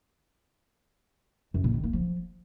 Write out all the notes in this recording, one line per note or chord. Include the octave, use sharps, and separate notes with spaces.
F#2
A#2
D#3
A#3
F3